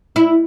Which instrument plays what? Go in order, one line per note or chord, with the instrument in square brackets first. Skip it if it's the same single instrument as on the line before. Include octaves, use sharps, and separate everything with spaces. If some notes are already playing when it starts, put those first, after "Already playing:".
[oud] E4